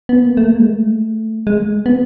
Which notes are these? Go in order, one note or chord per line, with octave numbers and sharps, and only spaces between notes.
B3
A#3
A3
A#3
G#3
A3
G#3
B3